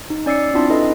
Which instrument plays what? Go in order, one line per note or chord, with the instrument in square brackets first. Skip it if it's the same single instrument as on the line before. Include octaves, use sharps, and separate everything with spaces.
[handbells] D#4
C#4 D5 E6 C7 C#7
C4 D4 E4 F4 A5
D#4 E4 A4 B4 D#5